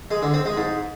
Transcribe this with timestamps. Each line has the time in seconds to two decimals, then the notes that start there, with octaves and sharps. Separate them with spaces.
0.11 G#3
0.22 D3
0.34 C4
0.45 G#3
0.57 G#2